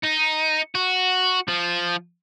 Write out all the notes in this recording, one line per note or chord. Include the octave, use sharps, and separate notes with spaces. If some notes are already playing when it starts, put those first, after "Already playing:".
D#4
F#4
F3